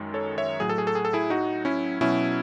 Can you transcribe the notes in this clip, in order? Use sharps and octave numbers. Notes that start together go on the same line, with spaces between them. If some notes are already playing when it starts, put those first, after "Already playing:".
Already playing: F#2 D#3 G#3
A4 C#5
C#5 E5
A2 F#3 G#4
A4
G#4
A4
G#4
A4
E4 G#4
D#4 F#4
C#4 E4
B2 F#3 C#4 E4